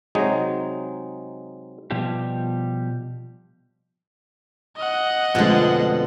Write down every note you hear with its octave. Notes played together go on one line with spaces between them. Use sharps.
C3 F#3 G#3 D#4 G#4
B2 F3 G3 G4
D#5 F#5
F2 B2 D3 G#3 A3